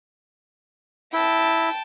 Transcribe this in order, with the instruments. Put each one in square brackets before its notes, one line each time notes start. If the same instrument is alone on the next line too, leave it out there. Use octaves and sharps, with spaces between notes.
[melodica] E4 [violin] G5 A5